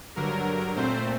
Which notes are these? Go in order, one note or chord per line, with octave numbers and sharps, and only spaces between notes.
G2 D3 F#3 A#4
A#2 A3 C4 C5